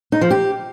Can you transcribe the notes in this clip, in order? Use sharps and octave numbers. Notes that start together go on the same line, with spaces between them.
D#4
F3
G4